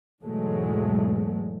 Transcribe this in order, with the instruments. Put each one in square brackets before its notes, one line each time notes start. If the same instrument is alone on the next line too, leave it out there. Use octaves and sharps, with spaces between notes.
[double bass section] E2 G#2 B2 F#3 G#3 A3